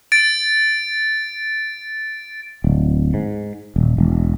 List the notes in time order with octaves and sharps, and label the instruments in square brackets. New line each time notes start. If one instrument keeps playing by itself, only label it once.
[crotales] A6 D7
[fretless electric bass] D1
G#2
D#1
E1